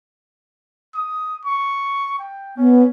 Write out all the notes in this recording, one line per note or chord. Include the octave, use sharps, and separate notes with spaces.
D#6
C#6
G5
B3 C#4